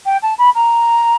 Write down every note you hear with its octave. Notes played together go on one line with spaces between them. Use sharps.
G5
A5
B5
A#5